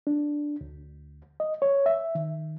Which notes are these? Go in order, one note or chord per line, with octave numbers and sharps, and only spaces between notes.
D4
D2
D#5
C#5
E5
D#3